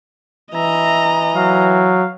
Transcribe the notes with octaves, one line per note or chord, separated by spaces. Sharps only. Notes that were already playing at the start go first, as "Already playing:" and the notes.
E3 D#5 E5 A#5
F#3 F5